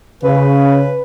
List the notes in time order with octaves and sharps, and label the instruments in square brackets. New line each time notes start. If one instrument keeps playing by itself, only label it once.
[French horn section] C#3 [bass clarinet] B4